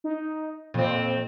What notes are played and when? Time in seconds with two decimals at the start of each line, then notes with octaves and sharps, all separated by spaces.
0.04 D#4
0.74 F2 A#2 C4